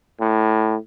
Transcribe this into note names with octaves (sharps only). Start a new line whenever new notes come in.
A2